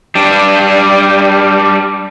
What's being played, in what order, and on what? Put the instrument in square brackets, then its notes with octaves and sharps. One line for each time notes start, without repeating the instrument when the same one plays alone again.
[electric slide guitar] G3 D4